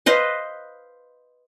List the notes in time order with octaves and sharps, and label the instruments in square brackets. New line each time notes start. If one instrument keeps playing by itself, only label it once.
[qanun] B4 C5 D#5 F5